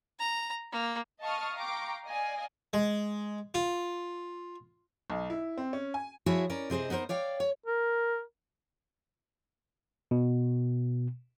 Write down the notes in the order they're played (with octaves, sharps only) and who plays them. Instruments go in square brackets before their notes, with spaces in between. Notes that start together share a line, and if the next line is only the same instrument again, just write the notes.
[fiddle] A#5
A#3
[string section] D#5 F5 A5 C#6 D#6 F6
F5 G5 A#5 C#6 D6
D5 D#5 F5 G#5
[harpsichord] G#3
F4
[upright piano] B1
E4
C4
C#4
G#5
[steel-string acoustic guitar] F3 E4 F#4 G#4 C#5 E5
C#4 A#4 D5
C3 C4 G#4 C5 D#5
B3 D#4 A#4 C5
C#5 D5 F5 G5
C#5
[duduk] A#4
[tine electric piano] B2